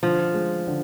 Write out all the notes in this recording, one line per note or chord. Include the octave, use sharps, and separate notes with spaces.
D3 F3
G#3
D3